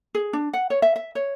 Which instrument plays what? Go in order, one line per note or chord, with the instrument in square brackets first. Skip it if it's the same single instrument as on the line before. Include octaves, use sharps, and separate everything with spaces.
[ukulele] G#4
D4
F#5
C#5
E5
E5
C#5